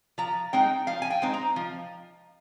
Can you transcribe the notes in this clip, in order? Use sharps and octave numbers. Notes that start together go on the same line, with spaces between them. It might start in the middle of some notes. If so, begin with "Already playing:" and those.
F3 A#5
G#3 C4 D#4 G5
F3 F5
G#5
G5
G#3 C4 D#4
A#5
F3